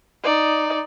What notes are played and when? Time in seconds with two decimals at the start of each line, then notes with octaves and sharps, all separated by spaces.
0.23 D#4 D5